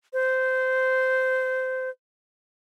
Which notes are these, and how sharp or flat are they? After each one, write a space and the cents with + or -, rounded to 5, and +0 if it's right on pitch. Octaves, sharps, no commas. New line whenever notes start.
C5 -15